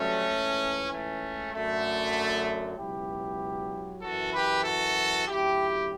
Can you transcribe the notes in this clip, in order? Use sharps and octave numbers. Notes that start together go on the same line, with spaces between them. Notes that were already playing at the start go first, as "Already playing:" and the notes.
Already playing: G2 D3 F#3 A3 C#4
C#2 C#3 E3
A3 C#4
F#2 D3 F#3 A3
C#2 B2 F#3 E4 G4
F#2 E3 F#4 A4
G4 B4
F#4 A4
D2 C#3 F#3 E4 G4